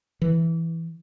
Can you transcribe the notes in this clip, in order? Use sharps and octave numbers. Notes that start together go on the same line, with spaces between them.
E3